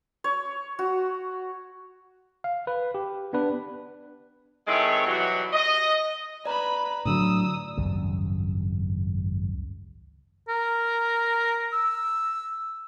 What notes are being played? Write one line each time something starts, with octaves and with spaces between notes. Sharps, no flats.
C#5
F#4
F5
B4
G4
B3 D4 B4
D#3 G#3 C4 E4 A4 C#5
B2 E3 F#3 G3 F#4
D#5
B4 D5 A#5 B5
A2 D3 F#3 D#6 E6
G#1 C#2 F#2 G3
A#4
E6